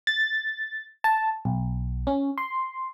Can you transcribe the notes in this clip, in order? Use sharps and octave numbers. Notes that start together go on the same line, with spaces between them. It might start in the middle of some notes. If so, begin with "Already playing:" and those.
A6
A5
B1
C#4
C6